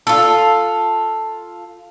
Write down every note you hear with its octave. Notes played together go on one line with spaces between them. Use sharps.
F4 A4